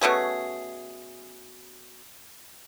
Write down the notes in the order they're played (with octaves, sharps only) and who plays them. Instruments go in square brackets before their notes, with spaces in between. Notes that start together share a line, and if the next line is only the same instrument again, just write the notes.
[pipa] B2 A3 C#4 G#4